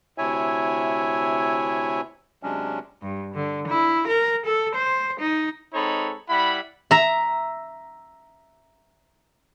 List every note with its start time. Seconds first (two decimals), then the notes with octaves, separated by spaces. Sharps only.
0.18 D2 C3 E4 C#5 E5 G#5
2.43 C3 F#3 G#3 C#4 D4
3.02 G2
3.34 D3
3.67 E4
4.07 A#4
4.46 A4
4.75 C5
5.20 D#4
5.74 G#3 C4 D#4 A4 C#5 B5
6.29 G3 E4 F#5 B5
6.91 E5 A#5